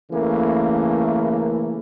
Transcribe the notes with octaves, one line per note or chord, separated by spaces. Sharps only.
C#3 E3 A3 A#3